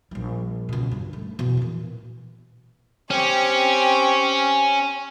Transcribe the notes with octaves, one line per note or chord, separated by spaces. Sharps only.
A#1 G3
C#2 B2
G2
A3
E2 B2
A#2 E3
C4 C#4 G4